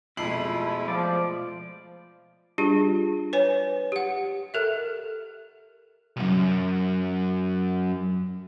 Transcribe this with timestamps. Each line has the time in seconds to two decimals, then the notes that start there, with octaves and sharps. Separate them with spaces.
0.17 F2 B2 G#3 A3 E4 C7 F#7
0.88 F3 D5
2.58 G3 D4 F4 G4 G#4
3.33 B4 C#5 G#5
3.92 G4 F#5
4.54 A4 A#4 E5
6.17 C2 F#2